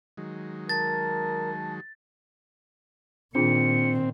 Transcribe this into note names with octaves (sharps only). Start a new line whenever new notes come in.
D#3 F#3 G#3
A#4 A5 A6
A#2 D#3 C4 D4 F4 G#4 C#7